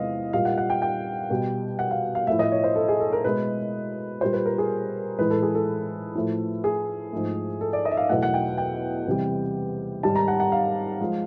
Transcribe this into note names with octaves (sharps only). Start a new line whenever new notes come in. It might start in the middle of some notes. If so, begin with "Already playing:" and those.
Already playing: E2 C3 F3 G#3 D#5 F5
A#2 G3 F5
F#5
F#5
G5
G5
B2 G3
F#5
F5
F5
A2 F3 A3 E5
D#5
C#5
C5
A4
G#4
A4
A#4
B2 G#3 B4
A#2 G3 C5
B4
A#4
G#4
A2 E3 G#3 B4
A4
G#4
A4
A2 F3 A3
G#4
G#2 F3 A3
A4
D5
D#5
E5
F5
E2 B2 F#3 A3 F#5
F#5
G5
G5
E2 C3 E3 G3
G#2 D#3 G3 A5
A#5
F#5
F#5
F5
F3 G#3